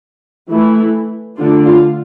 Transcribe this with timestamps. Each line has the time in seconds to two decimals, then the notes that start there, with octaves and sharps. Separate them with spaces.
0.51 E3 A3 E4
1.37 D3 A3 D4 F4
1.65 F4